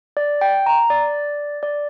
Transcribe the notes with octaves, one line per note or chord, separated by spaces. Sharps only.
D5
G5
A#5
D5
D5